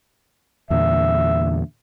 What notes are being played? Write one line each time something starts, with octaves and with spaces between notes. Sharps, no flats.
E2 A#2 D3 E5